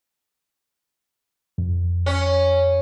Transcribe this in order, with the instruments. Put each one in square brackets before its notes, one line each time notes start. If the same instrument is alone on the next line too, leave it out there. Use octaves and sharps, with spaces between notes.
[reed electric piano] F2
[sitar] C#4